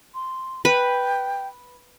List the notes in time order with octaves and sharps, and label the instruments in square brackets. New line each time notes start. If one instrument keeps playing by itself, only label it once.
[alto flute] C6
[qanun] B4 [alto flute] G5